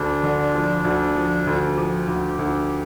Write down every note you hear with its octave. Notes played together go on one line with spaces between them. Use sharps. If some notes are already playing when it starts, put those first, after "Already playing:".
Already playing: D2 D4
D3
F3
D2
F3
D2
F3 G4
D2
D2